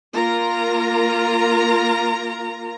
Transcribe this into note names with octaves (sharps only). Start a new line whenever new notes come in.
A#3 F4 A#4 A#5